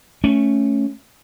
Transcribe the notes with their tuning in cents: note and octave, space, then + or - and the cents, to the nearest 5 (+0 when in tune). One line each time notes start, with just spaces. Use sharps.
A3 +0 C#4 +0